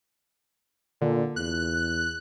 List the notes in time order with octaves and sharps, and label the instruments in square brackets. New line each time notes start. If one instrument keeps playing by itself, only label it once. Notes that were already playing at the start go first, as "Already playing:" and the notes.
[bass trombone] A#2 [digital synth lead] D3
[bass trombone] E2 [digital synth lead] F#6